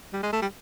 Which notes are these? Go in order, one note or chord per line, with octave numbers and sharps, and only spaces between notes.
G3
G#3
A3
G3